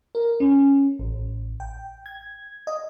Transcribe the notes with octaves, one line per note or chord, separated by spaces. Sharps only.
A#4
C#4
A1
G5
G#6
D#5